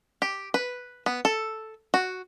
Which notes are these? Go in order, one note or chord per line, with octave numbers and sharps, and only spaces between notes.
G4
B4
B3
A4
F#4